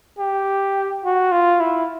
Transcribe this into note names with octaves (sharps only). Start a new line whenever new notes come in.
G4
F#4
F4
E4